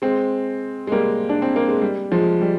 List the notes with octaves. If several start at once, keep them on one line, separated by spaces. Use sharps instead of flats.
G#3 C4
G#3
G3 A#3
D4
C4
A#3
G#3
G3
F3 G#3
G3